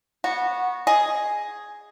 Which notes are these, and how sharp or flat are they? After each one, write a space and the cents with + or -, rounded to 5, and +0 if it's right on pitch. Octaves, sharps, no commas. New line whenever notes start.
B3 -20 F#4 -5
G#4 +0 D#5 +0